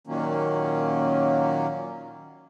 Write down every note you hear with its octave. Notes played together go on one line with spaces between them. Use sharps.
A#2 D#3 F#3 A#3 C#4